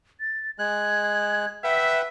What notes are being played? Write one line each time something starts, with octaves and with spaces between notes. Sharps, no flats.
A6
G#3 F#6 G#6
B4 E5 F#5 G5 B6